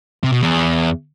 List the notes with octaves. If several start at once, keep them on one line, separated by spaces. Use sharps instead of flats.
C3
B2
E2